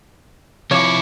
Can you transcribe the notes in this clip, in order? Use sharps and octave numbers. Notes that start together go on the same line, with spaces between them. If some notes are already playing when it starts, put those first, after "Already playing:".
C3 F3 E4 C#5 F5 D6 C#7